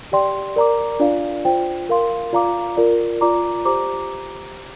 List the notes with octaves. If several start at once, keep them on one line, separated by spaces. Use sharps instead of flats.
G4 D5 G5 C6
A#4 D5 A#5 D6
D4 F4 D5 F5
F4 C5 G5
A#4 F5 C6
F4 D5 F5 A#5 D6
F4 A#4 D5
F4 D5 A#5 D6
G4 C5 A#5 D6